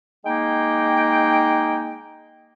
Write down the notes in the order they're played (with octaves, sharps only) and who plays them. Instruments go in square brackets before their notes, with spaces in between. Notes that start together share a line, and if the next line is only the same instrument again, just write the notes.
[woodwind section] G#3 A#3 D#4 G5